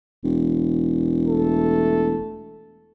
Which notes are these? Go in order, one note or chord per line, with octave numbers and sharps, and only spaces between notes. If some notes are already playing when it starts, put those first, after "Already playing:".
E1
A3 A4